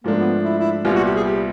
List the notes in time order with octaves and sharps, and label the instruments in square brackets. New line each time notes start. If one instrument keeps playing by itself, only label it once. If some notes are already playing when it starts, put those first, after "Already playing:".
[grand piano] G#2 F3 A3 D4 [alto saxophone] A#3
[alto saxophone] B3
E4
E4
[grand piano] C2 A#2 G3 B3 [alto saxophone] F4
[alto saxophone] F#4
G4
G#4
G4